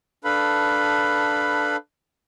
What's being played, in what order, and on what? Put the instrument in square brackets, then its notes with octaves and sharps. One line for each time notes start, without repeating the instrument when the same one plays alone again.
[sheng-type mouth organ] D4 A4 B4 F5 B5